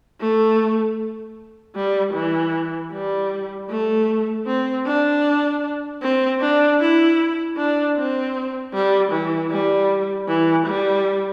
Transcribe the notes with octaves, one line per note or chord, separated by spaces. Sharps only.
A3
G3
E3
G3
A3
C4
D4
C4
D4
E4
D4
C4
G3
E3
G3
E3
G3